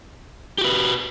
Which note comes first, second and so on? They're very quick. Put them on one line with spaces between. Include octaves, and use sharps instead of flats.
G4 F#4 B4